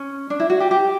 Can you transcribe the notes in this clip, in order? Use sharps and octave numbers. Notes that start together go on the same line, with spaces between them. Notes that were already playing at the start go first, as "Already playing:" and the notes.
Already playing: C#4
D4
E4
F#4
G4
G4